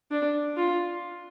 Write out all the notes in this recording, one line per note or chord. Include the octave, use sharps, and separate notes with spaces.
D4
F4